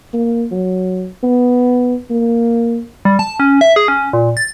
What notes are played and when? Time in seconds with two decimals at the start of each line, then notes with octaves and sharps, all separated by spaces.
0.14 A#3
0.51 F#3
1.23 B3
2.10 A#3
3.05 G3
3.19 A5
3.40 C#4
3.61 E5
3.76 G#4
3.88 C#4
4.13 A#2
4.37 A6